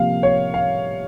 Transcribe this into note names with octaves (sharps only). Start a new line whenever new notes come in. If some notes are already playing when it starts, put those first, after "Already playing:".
Already playing: C3 F3 A#3 F5
C#5
F5